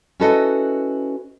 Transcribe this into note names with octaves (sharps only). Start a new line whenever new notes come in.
C#4 E4 F#4 A4 B4 D#5